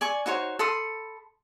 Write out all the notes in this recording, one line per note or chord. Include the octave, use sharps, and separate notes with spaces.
D5 G#5 C#6
D#4 F#4 C5 C#5
A4 B5 C6 D#6